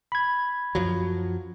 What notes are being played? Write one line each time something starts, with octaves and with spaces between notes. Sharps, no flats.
B5 G#6
F#2 F3 F#3